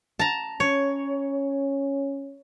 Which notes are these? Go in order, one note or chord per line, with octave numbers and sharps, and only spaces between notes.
A5 A#5
C#4 C#5